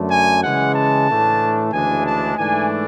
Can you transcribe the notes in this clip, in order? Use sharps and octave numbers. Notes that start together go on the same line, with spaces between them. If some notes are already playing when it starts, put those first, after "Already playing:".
Already playing: F#2 D3 A3
G#5
C#3 E3 G#3 F#5
A5
A2 E3 A3 D4
D2 C#3 E3 G#3 D4 G#5
A5
G#2 E3 A3 D4 G#5